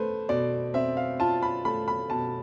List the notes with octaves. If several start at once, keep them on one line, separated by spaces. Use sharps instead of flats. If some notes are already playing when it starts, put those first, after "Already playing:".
Already playing: A3 B4 C5
B2 D5
C4 E5
F5
F4 A5
B5
A3 B5
B5
B2 A5